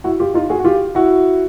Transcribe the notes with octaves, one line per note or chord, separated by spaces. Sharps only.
E4 F#4
F4 G4
D#4 F4
F#4 G#4
F#4
F4 G4
E4 F#4